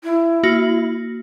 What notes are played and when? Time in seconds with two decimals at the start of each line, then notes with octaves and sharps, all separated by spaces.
0.04 E4
0.43 A#3 F#4 A#6